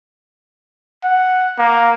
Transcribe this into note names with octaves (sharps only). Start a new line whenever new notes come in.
F#5
A#3